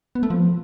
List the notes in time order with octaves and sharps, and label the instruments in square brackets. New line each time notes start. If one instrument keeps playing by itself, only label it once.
[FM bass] B3
A3
F3